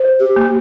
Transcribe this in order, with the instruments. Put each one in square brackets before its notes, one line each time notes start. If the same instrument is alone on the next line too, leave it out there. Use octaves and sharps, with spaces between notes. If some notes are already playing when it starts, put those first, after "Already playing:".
Already playing: [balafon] C5
[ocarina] G4
[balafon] A#3